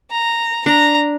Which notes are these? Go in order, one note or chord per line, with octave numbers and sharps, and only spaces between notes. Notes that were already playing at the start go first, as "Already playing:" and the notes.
A#5
D4 A#5